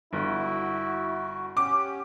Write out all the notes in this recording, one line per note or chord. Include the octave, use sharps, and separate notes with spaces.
G1 E4 F#4
C#4 G4 F#5 D6